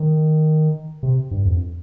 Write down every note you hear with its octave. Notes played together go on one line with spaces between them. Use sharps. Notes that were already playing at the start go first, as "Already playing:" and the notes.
Already playing: D#3
C3
G2
F2